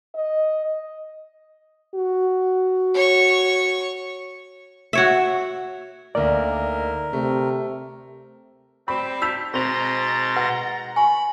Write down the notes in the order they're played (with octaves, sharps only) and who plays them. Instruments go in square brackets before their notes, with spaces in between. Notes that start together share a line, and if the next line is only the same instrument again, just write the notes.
[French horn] D#5
[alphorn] F#4
[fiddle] C#5 C#6
[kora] F#4 C#5 E5
[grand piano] D2 A#3 D#4 [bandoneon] A#4 [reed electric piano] D5
[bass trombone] C3 [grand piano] A3
[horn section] G3 C4 [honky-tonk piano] B5
[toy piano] D#4 E6 [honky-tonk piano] G6 B6 F7
[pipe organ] B2 C6 A6 [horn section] D#3 G#3 A#5 [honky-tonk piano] C4 F7
[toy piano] B4 [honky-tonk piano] F#5
[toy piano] G#5 [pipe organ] B5 [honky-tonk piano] C#6